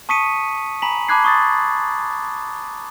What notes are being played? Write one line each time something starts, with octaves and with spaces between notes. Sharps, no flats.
A5 C#6 D#6 B6 C#7 D#7
G#5 A#5 B5 B6 F#7
A5 B5 D6 F#6 G#6 C7
C#6 D#6 A6